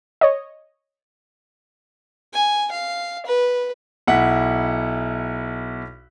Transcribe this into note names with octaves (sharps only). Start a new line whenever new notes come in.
C#5 D#5
G#5
F5
B4
B1 E4 F#5 B6